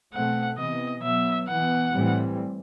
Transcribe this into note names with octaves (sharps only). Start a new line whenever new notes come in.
B2 A3 C4 F#5
C3 E3 B3 D#5
B2 F#3 B3 E5
E3 B3 F#5
A2 E3 G3 C4